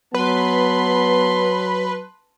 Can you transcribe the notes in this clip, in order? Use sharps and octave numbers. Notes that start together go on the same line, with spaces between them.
F#3 B3 B4 A5 C6